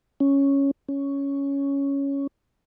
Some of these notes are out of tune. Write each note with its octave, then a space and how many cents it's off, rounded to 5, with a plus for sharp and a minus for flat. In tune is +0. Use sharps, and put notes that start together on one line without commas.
C#4 +0
C#4 +5